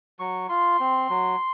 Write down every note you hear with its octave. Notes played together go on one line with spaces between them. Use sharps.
F#3 C#6
F4 C6
C4
F#3